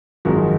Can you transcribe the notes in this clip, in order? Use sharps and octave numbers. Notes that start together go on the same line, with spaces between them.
G#1 F#2 F3 G#3 F#4 A#4